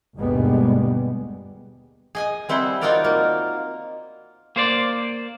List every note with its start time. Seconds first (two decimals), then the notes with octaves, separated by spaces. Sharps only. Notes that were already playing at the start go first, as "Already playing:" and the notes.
0.15 G1 D#2 B2 G3 G#3 B3
2.15 G#4 D#5 G#5
2.49 G3 C4 E4 C5 F#5
2.81 D#4 F4 F#4 A#4 D5 A#5
3.04 A#3
4.56 A#3 C5 D5